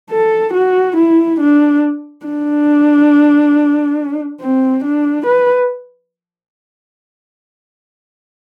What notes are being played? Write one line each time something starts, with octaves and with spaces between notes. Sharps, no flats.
A4
F#4
E4
D4
D4
C4
D4
B4